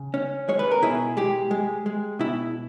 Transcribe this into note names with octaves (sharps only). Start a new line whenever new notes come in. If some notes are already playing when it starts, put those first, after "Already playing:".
Already playing: C#3
C#4
G#3 C#5
B4
A#4
B2 E4 G#4
G#3 G4
G#3
G#3
B2 E4